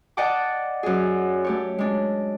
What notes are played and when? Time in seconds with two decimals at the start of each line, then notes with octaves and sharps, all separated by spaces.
0.17 D5 D#5 F#5 G5 A5 D6
0.83 F#2 G#4
1.44 A3 G4 C#5
1.78 G#3 D4